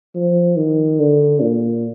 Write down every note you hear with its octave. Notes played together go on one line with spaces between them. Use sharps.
F3
D#3
D3
A#2